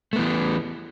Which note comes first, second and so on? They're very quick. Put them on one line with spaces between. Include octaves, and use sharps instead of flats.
A3 B3 E3